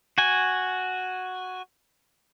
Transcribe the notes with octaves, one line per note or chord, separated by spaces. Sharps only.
F#4 G#5